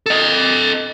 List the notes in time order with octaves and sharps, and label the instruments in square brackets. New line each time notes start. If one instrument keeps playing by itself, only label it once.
[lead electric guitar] A4 D#5